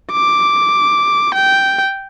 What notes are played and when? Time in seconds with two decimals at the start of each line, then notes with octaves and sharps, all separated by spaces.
0.12 D6
1.34 G5